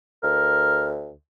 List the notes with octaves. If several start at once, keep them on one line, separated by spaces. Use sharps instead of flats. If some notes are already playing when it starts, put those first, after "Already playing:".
D2 A#4